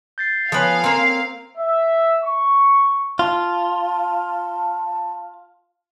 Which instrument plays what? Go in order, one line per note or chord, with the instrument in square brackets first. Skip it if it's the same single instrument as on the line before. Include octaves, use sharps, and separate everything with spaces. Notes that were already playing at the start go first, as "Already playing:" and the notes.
[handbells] G6 A6 C7
[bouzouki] F3 B3 [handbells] C#5 G#5 D#6 [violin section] F5
[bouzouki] A#3 C4 [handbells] A#5
[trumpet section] E5
C#6
[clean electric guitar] F4 [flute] A5